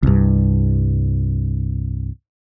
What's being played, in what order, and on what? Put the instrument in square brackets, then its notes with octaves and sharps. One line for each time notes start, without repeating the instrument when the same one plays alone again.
[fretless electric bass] C2 G2